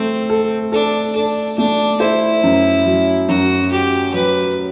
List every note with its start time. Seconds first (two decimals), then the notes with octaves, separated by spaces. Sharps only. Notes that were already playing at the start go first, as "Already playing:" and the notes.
Already playing: A3 C4 A4
0.30 A4
0.72 D4 A4
1.15 D4 A4
1.58 A3 D4
2.00 E4 C5
2.43 F#2
2.86 F#3
3.29 F#2 F#4
3.71 F#4 G4
4.14 F#3 B4